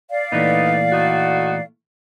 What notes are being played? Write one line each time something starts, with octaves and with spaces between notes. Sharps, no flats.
D5 F5
A#2 E3 A3 B3 D#4
A2 D#4 F#4